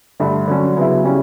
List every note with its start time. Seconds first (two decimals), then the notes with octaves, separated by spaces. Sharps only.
0.20 G2 D3 A3
0.48 D3 F#3 C#4
0.77 C#3 F#3 B3 E4
1.04 C#3 G3 C#4 E4